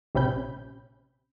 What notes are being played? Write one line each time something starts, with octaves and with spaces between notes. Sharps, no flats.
A#1 C3 C4 C#4 B5 G6